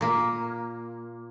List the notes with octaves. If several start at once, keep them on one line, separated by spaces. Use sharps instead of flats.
A#2 A#3